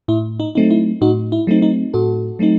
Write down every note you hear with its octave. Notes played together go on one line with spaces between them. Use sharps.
A2 E4
D#4
F#3 A3 C4 D#4
E4
A2 D#4 F#4
E4
F#3 A3 C4 D#4
D#4
A2 F#4 A4
F#3 A3 C4 D#4